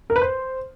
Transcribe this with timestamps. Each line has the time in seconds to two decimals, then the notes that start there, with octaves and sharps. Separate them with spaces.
0.10 A#4
0.16 B4
0.22 C5